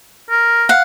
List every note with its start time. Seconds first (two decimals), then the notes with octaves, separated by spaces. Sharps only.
0.30 A#4
0.69 F5 F#5